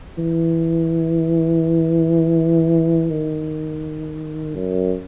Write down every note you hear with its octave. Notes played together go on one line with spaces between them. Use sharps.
E3
D#3
F#2